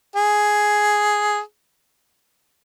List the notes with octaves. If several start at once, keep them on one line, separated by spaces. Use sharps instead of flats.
G#4